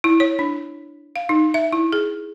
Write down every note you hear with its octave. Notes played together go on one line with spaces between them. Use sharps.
E4
C#5
D4
F5
D#4
E5
E4
G#4